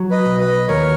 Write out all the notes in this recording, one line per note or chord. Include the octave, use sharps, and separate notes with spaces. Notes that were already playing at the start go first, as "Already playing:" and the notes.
Already playing: F#3
B4 D#5
B1
B4 D#5
D#2 A#4 C#5